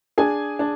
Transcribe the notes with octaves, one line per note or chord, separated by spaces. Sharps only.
D4 G#4 G#5
D4